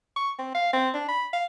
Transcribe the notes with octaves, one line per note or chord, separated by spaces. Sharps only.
C#6
C4
F5
C4
D4
B5
F5